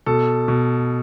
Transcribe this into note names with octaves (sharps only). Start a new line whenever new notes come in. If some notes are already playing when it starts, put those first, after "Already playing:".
B2 A4
B2